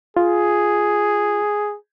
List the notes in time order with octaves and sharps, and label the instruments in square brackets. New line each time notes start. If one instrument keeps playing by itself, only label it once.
[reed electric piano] F4 [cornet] G#4